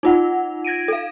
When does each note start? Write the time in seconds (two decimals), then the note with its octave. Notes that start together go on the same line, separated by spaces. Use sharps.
0.03 D#4 F4 F#5
0.65 G#6 A#6 D7 D#7
0.88 A4 F5